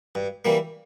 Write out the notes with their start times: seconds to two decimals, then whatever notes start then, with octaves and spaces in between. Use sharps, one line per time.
0.15 G2
0.45 E3 G3 A#3